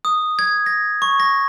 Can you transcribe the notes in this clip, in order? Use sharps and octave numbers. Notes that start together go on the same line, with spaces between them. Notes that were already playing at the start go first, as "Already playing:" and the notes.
D#6
G#6
A#6
C#6
A#6